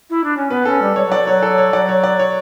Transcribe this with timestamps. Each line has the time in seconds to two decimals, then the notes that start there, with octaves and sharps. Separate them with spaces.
0.10 E4
0.23 D4
0.36 C#4
0.50 B3 B4
0.65 C#4 A4
0.81 G3
0.96 G3 C#5
1.05 F#3
1.12 D5
1.22 F#3
1.27 C#5
1.43 A4
1.58 C#5
1.73 F#3 D5
1.89 C#5
2.04 D5
2.19 C#5